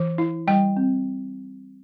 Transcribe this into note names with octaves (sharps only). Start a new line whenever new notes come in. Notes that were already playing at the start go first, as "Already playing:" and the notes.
Already playing: E3
E4
G3 G5
C4